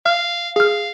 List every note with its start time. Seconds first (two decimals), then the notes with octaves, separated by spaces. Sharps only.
0.06 F5 F6
0.56 G#4 F5 F6